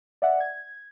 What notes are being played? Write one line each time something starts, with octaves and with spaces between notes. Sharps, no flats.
D5 E5 F#5
G#6